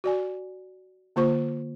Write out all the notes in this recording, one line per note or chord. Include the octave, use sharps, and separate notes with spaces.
F#4 D5 G#5
D3 A#3 F4 C5 C#6